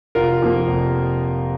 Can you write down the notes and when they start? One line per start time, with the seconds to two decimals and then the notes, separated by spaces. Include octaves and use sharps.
0.15 F1 F4 A#4
0.42 F2 F3 A#3
0.68 F1